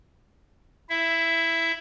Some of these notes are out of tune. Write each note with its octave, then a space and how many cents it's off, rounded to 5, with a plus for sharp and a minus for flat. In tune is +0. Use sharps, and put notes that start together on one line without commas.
E4 +0 E5 +10